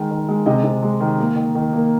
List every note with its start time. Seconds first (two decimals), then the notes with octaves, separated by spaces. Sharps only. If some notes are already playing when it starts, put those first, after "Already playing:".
Already playing: D#3 G#3
0.11 D#3
0.29 G#3
0.46 C3 D#5
0.64 C3
0.83 G#3
1.00 D#3
1.18 A#3
1.36 D#3
1.55 D#3
1.73 A#3